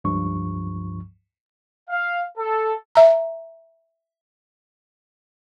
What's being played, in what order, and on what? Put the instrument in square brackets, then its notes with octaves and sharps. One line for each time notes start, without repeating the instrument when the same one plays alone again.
[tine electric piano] C#2 G2 F3 C#6
[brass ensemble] F5
A4
[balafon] E5 A#5